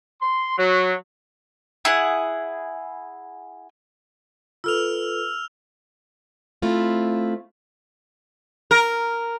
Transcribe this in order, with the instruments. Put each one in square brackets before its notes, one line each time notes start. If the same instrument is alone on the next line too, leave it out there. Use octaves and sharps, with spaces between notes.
[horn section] C6
F#3
[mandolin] E4 G#4 F#5
[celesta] F4 A4 B4 [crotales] E6 F6 F7
[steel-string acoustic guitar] A3 C4 E4 F4
[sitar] A#4